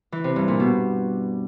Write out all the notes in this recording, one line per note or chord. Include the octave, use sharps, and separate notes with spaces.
E3
C3
G2
A#2
B2